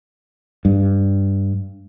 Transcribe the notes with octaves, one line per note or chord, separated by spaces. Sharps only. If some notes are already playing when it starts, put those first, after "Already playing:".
G2